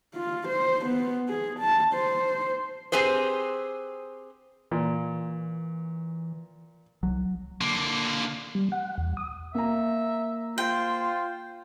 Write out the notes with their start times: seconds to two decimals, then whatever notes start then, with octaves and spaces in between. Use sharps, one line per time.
0.15 F4
0.48 C5
0.86 B3
1.29 G#4
1.59 A5
1.94 C5
2.92 C4 G4 G#4 B4 C5
4.71 A#2 E3
7.03 C2 F#3
7.61 D3 A#3
8.55 G3
8.72 F#5
8.98 E2
9.17 D#6
9.55 A#3 E5 A#5
10.58 F4 C5 G5